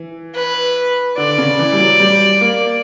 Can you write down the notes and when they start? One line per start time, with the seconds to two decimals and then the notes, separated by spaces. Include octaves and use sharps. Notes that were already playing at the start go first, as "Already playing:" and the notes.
Already playing: E3
0.35 B4
1.17 D3 D5
1.38 C#3
1.59 E3
1.72 G3
1.79 F#3
2.00 G3
2.41 A#3